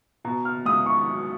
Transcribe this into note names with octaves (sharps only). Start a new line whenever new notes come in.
B2 A#5
F6
C#2 D#6
C#6
F#3